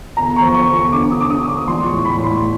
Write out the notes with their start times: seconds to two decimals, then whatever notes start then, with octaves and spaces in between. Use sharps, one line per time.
0.17 G1 A#5
0.36 C#6
0.42 F3
0.55 C#6
0.67 G1
0.74 C#6
0.92 D3 D6
1.11 D#6
1.17 D3 D6
1.30 D#6
1.43 G1
1.48 D6
1.67 A#1 C6
1.86 C#6
1.93 A2
2.05 B5
2.18 A2
2.24 C6